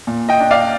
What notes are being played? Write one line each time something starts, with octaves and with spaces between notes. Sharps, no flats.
A#2
D#5 G5
D4
D5 F5